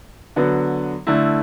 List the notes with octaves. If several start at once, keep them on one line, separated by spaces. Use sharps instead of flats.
D3 F#3 B3
D3 A3 E4